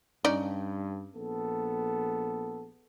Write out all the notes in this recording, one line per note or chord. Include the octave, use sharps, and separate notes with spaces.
G2 C#4 D#4 D5
A#1 B3 A4